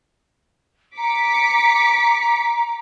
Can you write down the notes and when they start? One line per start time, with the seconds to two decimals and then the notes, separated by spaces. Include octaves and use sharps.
0.98 A#5 D6 B6 C#7